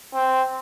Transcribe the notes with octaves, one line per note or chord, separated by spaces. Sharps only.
C4